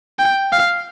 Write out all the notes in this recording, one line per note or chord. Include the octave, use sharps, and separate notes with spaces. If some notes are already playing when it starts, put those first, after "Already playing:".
G5
F5